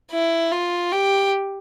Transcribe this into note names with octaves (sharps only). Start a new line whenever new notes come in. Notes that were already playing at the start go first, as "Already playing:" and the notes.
E4
F4
G4